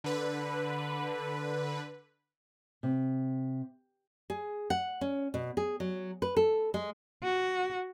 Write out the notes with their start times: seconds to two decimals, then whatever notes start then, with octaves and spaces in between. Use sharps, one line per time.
0.04 D3 B4
2.83 C3
4.30 G#4
4.70 F#5
5.01 C#4
5.34 B2
5.57 G#4
5.80 F#3
6.22 B4
6.37 A4
6.74 G#3
7.24 F#4